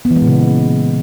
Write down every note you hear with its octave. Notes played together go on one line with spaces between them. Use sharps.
B3
E3
G#3
A#2
C#3